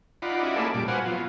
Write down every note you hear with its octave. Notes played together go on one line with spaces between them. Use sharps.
D#4 F4 D5 F#5 B5
C#4 E4 F#4 D5 D#5
A3 A#3 G#4 D5 A5 B5
A#2 G3 D6
F#4 B4 C5 F5 F#5 G#5
F#3 B3 F4